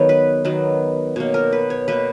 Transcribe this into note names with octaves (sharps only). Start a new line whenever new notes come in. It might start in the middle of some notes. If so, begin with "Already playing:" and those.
Already playing: D#3 F#3 B3 C#5
B4
D#3 F#3 B3
B2 A#3 C#5
A#4
B4
C#5
B2 A#3 B4